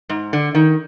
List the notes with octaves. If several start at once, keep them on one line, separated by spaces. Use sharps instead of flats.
G#2
D3
D#3